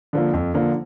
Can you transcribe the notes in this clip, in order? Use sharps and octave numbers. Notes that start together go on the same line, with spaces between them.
D3 F3 A#3
F2
D3 F3 A#3